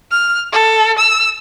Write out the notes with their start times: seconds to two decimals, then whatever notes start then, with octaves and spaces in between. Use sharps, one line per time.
0.12 F6
0.52 A4
0.99 E6